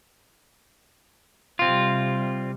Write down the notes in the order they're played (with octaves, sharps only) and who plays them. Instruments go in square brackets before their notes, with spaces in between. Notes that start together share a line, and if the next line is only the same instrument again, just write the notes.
[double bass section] C3 G3 [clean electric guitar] C4 F4